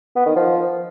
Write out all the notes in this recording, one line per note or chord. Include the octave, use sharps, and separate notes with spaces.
B3
D#3
F3